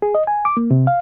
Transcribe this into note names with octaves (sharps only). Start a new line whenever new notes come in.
G#4
D#5
G#5
D6
A#3
C3
F5